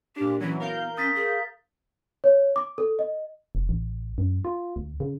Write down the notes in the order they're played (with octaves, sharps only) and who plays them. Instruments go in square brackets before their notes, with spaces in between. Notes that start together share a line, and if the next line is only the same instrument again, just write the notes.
[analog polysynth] A#2 D4 [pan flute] G4
[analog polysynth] E3 F#3 [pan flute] C#4
[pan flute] B3 [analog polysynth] A#4 F5 G6
[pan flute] C#4 [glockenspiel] D#6 A6 B6
[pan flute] G#4
[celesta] C#5
D6
A4
D#5
[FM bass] F1
A1
F#2
F4
D2
C#3